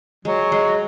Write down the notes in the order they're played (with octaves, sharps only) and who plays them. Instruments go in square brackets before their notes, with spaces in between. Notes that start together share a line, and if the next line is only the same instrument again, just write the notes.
[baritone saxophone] F#3 [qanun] G#3
[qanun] G#3